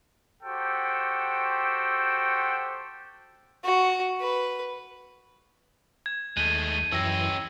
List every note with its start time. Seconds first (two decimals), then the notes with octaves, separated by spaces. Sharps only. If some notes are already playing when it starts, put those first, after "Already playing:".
0.43 F#4 G4 A4 C5 G5
3.64 F#4
4.20 B4
6.06 G#6
6.37 D#2 G#3 A3 G6 D#7
6.92 F#2 E3 C#4 G4 E6 A#6